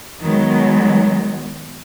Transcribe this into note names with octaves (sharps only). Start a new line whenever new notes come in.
D#3 F#3 G#3 B3